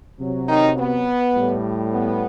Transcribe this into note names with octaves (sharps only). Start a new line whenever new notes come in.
C3 F#3
D#3 D#4
B3
A2 G3
B3